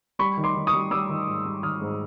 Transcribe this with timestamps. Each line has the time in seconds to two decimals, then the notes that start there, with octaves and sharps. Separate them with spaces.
0.19 G3 B5 C#6
0.37 D#3
0.44 C6 D6
0.55 D#3
0.67 C#6 D#6
0.73 G3
0.91 G3 D6 E6
1.09 D#3
1.27 G#2
1.45 G3
1.63 D#3 D#6 F6
1.81 G#2